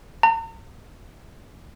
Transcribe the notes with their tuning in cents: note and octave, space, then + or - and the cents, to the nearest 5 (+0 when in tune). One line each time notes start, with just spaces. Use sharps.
A#5 -45